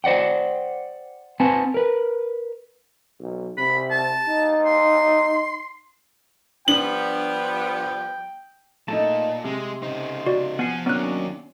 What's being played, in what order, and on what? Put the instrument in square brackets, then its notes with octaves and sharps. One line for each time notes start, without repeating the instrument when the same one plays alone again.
[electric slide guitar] C5 D5 F#5 G5
C4 B4 F#5 G#5 A5
A#4 B4
[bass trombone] B1
[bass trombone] C3 [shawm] B5
[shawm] A5
[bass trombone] D#4
[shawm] C6
[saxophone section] F3 G3 B3 [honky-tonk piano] D4 [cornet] G5 [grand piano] F#7
[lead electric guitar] A#2 [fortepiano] A3 D#4 [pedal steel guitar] A5
[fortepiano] C3 [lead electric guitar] G#3
[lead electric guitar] C#3 D#4 [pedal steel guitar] C5
[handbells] F#4 D5
[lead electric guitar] F3 [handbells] B3 C7 [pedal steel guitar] F#5 G#5
[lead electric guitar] D#3 A#3 [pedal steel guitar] F#3 C#4 D4 [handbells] B3 F#6